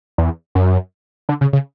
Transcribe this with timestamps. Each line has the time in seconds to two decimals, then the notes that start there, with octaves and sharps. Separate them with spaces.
0.18 E2
0.55 F#2
1.29 D3
1.41 C#3
1.53 C#3